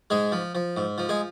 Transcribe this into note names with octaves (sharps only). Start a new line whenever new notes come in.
G#2 G#3 G#4
F3
F3
G#2
F3
G#3 G#4